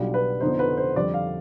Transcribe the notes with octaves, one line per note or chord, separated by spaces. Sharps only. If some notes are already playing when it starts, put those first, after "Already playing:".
Already playing: B1 B2 G3 D4 F4
B4
F2 D3 F3 B3 D#4 C5
B4
C5
F2 D3 G3 D5
F5